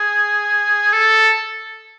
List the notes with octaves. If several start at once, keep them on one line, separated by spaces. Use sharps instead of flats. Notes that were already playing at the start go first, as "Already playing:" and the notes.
Already playing: G#4
A4